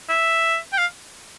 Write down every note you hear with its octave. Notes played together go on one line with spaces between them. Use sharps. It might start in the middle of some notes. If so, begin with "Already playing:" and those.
E5
G5
F5